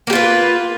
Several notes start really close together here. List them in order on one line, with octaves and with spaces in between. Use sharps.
A#3 G4 F4 B4